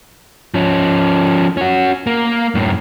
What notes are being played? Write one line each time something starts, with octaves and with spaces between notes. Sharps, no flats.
F3 C#4
C#4 F#4
A#3
F#2 A2